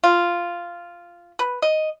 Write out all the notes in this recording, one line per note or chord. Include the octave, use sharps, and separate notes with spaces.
F4
B4
D#5